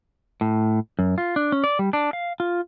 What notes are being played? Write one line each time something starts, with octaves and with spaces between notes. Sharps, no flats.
A2
F#2
F4
D4
C#4
D5
G3
D4
F5
F4